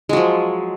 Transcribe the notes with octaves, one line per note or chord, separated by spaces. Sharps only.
F3 F#3 G#3